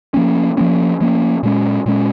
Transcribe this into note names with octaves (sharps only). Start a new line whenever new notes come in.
F3 A#3 C#4
F3 A#3 C#4
F3 A#3 C#4
A#2 G#3 C#4
A#2 G#3 C#4